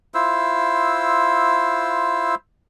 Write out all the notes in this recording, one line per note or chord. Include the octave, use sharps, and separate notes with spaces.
E4 F4 C5 E6